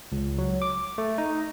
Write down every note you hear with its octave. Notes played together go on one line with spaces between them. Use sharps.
C#2
F#3
D6
A3
D#4